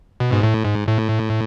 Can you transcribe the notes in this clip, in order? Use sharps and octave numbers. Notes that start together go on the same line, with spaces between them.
B2
G#2
A2
G#2
A2